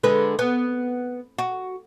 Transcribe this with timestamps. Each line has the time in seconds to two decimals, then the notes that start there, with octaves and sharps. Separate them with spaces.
0.03 D3 G#3 B4
0.39 B3
1.39 F#4